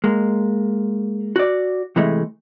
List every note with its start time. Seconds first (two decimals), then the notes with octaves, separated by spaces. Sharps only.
0.04 G#3 A#3
1.36 F#4 D5
1.96 C3 E3 G#3 A3